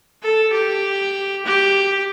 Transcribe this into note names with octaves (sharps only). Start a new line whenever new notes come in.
A4
G4
G4